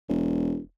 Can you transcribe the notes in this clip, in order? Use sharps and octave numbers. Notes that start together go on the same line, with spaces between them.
E1